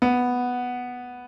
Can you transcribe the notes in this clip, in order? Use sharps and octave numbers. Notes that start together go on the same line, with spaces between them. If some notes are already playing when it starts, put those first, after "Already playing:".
B3